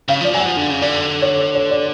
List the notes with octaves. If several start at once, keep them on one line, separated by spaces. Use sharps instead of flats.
C#3 F5
F3 D5
F#3 G#5
F#5
F3
D3
C#3
D3 D5
C#5
C#5
C#5
D5